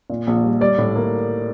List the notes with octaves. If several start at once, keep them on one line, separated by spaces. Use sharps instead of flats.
A#2
A#1
G3
G3 D5
A2
A#3